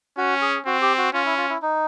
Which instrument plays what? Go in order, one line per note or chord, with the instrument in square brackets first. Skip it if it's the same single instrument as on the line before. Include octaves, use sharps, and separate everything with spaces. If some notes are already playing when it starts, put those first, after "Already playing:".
[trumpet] C#4 [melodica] F#4
[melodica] G#4
[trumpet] C4 [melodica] F#4
[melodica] G4
F#4
[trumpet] C#4 [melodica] F4
[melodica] E4
F4
E4
D#4